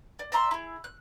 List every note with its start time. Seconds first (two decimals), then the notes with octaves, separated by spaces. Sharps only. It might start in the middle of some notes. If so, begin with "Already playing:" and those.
0.19 D5
0.32 D5 E5 A#5 C6
0.51 E4 G#4
0.84 F#6